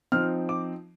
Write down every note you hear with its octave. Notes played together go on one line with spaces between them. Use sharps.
F3 C4 D#4 F6
D6